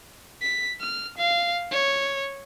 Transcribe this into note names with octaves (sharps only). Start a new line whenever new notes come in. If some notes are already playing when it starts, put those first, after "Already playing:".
B6
F6
F5
C#5